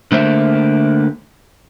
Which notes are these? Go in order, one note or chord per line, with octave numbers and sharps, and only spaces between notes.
D3 A3 A#3 C5 E5